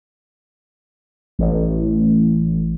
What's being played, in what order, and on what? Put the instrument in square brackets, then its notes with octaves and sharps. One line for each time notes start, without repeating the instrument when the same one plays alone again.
[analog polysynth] A1